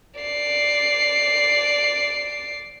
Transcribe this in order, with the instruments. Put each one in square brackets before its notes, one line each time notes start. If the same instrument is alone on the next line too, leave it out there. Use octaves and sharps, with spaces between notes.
[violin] D5 C7